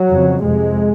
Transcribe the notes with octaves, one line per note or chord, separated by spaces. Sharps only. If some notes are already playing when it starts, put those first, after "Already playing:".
Already playing: F#3
F2 C#3
F2 C3 G#3